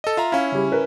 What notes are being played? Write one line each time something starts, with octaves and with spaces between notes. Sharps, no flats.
A4 D#5
F4 E5 A#5
C#4 E4 F5
C#3 G3
A#4 B4